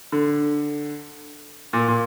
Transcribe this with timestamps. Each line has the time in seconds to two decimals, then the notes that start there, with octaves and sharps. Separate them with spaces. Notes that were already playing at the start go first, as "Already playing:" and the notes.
0.12 D3
1.73 A#2
1.88 A#2